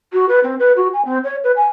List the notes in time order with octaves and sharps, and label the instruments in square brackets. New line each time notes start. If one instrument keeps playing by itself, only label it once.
[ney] F#4
B4
C4
B4
F#4
G#5
C4
C#5
B4
G#5